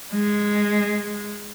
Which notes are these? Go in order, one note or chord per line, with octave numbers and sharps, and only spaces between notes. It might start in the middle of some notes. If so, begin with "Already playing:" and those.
G#3